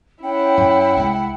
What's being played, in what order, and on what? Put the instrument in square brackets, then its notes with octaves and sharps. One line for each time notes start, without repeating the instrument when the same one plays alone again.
[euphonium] C#4 [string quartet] E4 F#5 [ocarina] G5
[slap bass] F#2
C2 G3 G#3